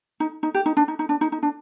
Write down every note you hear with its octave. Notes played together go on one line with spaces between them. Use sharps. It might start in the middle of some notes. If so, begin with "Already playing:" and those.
D#4
D#4
G4
D#4
D4
D#4
D#4
D4
D#4
D#4
D4